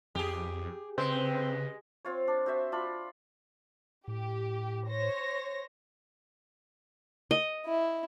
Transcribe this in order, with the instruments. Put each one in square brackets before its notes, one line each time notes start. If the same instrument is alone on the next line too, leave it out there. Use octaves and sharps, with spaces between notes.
[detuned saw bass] F2 [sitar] G4 G#4
[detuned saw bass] C#3 [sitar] G#3 [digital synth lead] C4 [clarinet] B4
[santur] C4 F4 C#5
D4
C4 F#4 C5 E5
D4 F4 B5
[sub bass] A2 [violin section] G4
[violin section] C5 C#5 A#6
[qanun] D#5
[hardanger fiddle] E4